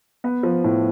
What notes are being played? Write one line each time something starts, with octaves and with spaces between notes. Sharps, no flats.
B3
F3
A2